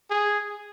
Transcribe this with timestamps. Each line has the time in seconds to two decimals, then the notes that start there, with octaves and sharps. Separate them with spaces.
0.10 G#4